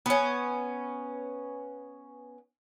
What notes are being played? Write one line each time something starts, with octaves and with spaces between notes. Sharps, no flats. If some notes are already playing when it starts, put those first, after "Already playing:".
B3 C#4